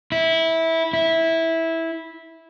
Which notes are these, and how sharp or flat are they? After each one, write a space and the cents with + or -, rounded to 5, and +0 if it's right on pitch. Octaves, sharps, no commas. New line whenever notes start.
E4 -15
E4 -10